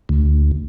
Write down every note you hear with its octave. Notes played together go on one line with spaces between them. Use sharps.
D2